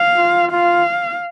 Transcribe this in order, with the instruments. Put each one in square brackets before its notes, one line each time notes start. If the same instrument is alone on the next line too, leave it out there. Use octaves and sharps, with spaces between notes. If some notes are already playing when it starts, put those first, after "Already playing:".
Already playing: [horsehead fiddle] F5
[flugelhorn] F4
[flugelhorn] F4 [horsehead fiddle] F5